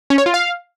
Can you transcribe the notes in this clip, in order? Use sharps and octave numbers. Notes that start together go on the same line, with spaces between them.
C#4
C#5
F4
F5